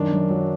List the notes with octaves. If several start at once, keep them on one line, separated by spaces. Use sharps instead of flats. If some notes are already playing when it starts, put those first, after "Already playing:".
Already playing: F#2 D#3 D4
F#2
F#3